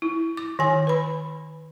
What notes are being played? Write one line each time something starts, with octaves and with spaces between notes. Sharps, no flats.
E4
D6
D#3 G#5
B4 B5